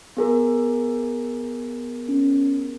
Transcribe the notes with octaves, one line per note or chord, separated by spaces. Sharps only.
B3 G#4 A#4
C#4